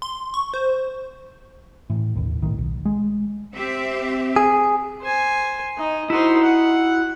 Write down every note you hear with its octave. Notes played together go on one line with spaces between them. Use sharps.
C6
C#6
C5
A2 E3
D#1 A1 D#2
B1 A2 D#3
B1
G#3
C4 G4 E5
G#4
C5 G#5
D#4 D#5
D#4 E4 F#4 C5
F#5